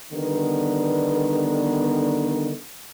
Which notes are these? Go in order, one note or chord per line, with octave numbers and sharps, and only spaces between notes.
D3 D#3 G3 B3